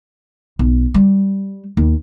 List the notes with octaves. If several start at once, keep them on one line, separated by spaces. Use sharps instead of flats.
B1
G3
D#2